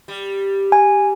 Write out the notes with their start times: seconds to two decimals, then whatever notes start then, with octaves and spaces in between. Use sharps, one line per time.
0.08 G3
0.72 G#5